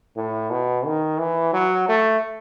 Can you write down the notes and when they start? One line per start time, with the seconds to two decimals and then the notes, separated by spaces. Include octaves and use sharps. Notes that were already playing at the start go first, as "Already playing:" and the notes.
0.17 A2
0.51 B2
0.86 D#3
1.19 E3
1.53 F#3
1.89 A3